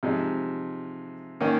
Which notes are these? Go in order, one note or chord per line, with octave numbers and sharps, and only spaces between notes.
C3 F3 G#3 D#4
D#3 A#3 C#4